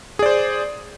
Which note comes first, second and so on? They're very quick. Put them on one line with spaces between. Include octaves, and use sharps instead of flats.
G#4 D5 C5